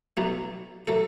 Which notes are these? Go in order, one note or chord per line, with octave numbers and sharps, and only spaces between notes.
B1 B2 F#3 A3
F#3 A3 A4